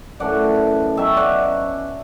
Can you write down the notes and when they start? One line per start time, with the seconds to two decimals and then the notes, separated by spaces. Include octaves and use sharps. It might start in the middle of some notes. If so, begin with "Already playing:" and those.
0.20 F#2 E3 A3 D5 F#5
0.97 B2 F#3 C#4 E5 G5
1.17 D5 F#5